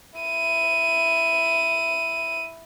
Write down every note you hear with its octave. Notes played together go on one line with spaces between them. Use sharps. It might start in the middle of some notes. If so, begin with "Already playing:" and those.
E4 D#7